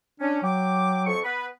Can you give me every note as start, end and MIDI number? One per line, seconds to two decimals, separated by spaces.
0.20 0.41 61
0.20 0.41 62
0.43 1.15 54
0.43 1.02 79
0.43 1.02 86
1.06 1.21 41
1.06 1.21 85
1.24 1.46 59
1.24 1.46 71